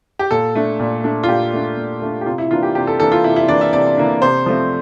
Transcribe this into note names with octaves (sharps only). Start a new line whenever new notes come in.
G4
A#2 A4
A3 D4
A#2
A3 D4
F4
A#2 G4
A3 D4
A#2
A3 D4
G4
C3 F4
E4
E3 A#3 D4 F4
G4
C3 G4
A4
E3 A#3 D4 A4
F4
C3 E4
E4
E3 A#3 D4 D5
E5
C3 D5
E3 A#3 D4
C3 C5
F3 A3 C4